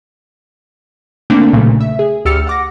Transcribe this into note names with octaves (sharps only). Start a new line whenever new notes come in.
D3 A3 A#3 C4 D4
B1 A#2 C#3 F#3 A3
E5
G#4
D2 G4 E6 F6 A6 C#7
F#5 D6 A#6